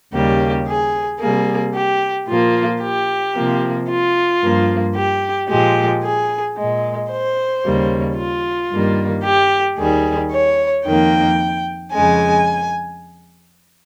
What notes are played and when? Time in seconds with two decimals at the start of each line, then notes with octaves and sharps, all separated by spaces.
0.13 D#2 C#3 G3 A#3 G4
0.68 G#4
1.20 C3 G3 A#3 G#4
1.75 G4
2.28 A#2 F3 A#3 F4
2.82 G4
3.36 C3 F3 A#3
3.89 F4
4.43 G2 F3 A#3
4.96 G4
5.49 A#2 F3 G#3 G4
6.03 G#4
6.57 A#2 G#3
7.10 C5
7.64 D#2 C#3 G3 A#3
8.17 F4
8.71 G2 D#3 G3 A#3
9.24 G4
9.78 D#2 D#3 G3 G#4
10.32 C#5
10.85 F2 D#3 A#3 G5
11.93 F2 C#3 G#3 G#5